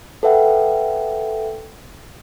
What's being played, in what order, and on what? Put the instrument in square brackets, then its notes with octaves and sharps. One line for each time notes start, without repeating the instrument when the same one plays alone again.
[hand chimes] A4 B4 E5 F#5 G5